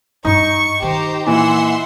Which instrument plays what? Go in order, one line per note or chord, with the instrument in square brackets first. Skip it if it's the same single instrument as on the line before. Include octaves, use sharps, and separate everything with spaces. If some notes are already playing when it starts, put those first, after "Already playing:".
[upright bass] G2 F4 [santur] D#4 [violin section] C#6
[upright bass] D#3 [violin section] G4 C5 A#5
[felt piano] A#2 E3 [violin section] E5 F#5 C6